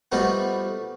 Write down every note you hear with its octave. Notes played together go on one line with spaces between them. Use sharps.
F3 G3 A3 B3 D#4 F#4